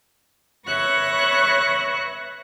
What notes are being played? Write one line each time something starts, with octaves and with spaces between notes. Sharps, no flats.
B4 C#5 E5 C#6 F#6 A#6